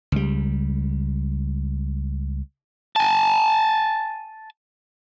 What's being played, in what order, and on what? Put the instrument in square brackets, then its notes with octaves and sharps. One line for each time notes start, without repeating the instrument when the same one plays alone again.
[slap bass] C#2 G3
[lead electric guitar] G#5 A5